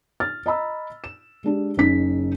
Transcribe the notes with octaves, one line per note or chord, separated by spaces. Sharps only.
F6 A6
D#5 A#5 B5 E6
E7
G#3 D4 G4
F#1 C#3 C#4 D#4 B6